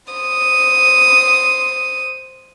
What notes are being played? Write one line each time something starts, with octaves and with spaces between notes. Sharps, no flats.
C5 D#6